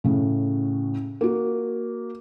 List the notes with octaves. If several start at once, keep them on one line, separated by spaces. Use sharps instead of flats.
A2 C#3
A#3 F#4